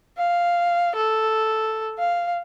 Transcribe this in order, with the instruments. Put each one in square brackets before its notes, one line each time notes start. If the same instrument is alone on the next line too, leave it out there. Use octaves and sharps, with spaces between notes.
[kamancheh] F5
A4
F5